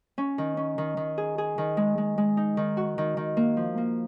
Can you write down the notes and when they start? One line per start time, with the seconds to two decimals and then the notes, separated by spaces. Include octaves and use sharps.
0.18 C#4
0.38 D#3
0.57 C#4
0.78 D#3
0.97 D#3
1.18 G#4
1.38 G#4
1.58 D#3
1.77 G#3
1.98 G#3
2.18 G#3
2.37 D#4
2.57 D#3
2.77 F#4
2.98 D#3
3.17 D#3
3.37 A#3
3.57 F3
3.78 A#3